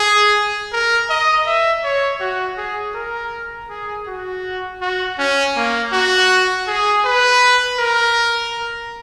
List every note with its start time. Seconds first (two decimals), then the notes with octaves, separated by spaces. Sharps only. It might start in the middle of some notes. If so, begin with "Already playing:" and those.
Already playing: G#4
0.73 A#4
1.10 D#5
1.46 E5
1.84 C#5
2.21 F#4
2.58 G#4
2.95 A#4
3.70 G#4
4.07 F#4
4.81 F#4
5.19 C#4
5.56 A#3
5.93 F#4
6.67 G#4
7.05 B4
7.79 A#4